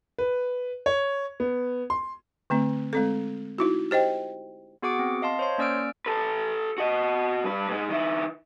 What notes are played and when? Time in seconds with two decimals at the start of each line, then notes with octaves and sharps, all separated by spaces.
0.18 B4
0.86 C#5
1.40 B3
1.90 C6
2.50 D3 A3 C4
2.93 G#3 C4 A4
3.58 D#4 E4 F#4
3.91 G4 C5 D#5 G5
4.82 B3 F#4 G#4 F#5 D6 D7
4.99 C4
5.22 D#5 F5 A5 C6
5.39 C5 C#5 C6
5.58 A#3 C#4 D5 E6 F6 D7
6.06 A4 B4
6.78 F#4 D#5
7.44 G2 B4
7.69 G#2 G#3
7.89 D#3 E4